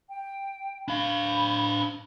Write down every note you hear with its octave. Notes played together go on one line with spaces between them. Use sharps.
G5
D4 F5 B5